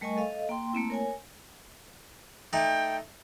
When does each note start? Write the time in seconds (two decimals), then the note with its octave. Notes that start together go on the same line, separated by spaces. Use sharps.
0.01 G3 A3 A#4 D#5 G#5 C#6
0.17 A4 D#5 F5
0.49 A#3 G5 C6
0.73 A3 A#3 C4 E4
0.90 A#4 C#5 G#5
2.53 A3 D#4 G5 D6